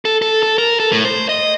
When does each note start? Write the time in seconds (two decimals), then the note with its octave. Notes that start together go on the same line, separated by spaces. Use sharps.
0.05 A4
0.22 A4
0.43 A4
0.58 A#4
0.80 A4
0.92 A2
1.05 C5
1.29 D#5